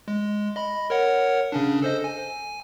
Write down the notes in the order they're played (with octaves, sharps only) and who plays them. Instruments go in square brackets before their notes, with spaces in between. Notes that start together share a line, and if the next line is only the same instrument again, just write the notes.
[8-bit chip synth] G#3
D#5 B5
A#4 C#5 F#5
C#3 C#4 D4
A4 C5 D#5
G#5